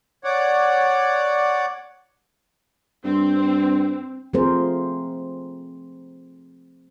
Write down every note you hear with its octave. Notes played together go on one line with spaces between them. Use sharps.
C#5 D5 F#5
G2 C4
F3 A3 C4 G#4 A#4 C5